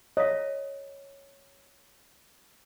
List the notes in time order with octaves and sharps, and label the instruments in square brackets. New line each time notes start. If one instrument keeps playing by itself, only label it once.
[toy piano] C#5 F5 [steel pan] D#5